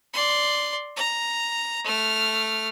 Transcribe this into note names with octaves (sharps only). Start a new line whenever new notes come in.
D5 C6
A#5
A3 F6